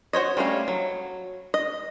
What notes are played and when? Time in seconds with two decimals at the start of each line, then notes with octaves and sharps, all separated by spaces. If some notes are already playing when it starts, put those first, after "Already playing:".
0.13 F#4 C5 C#5 D#5
0.37 G3 A3 A#3 C#4 F5
0.68 F#3
1.54 D#5